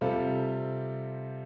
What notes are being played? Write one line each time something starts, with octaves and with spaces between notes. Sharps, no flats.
C3 G3 C4 F4 A4